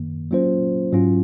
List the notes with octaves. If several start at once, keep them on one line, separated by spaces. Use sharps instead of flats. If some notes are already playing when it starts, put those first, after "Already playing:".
Already playing: F#2 D#3 A#3
F#3 A#3 C#4 F4 C5
G#2 F#3 C#4 F4